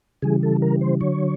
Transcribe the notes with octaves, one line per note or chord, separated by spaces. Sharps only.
C#3 E3 G3 G#4
A4
A#4
C5
D3 F#3 C#5